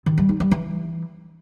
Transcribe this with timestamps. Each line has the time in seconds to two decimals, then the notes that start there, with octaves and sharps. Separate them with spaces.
0.06 D#3
0.18 G3
0.29 D#4
0.40 G3
0.51 E3